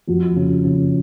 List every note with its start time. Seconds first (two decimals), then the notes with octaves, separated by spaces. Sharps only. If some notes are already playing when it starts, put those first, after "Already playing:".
0.07 F2 F#4
0.36 C#3
0.65 C#3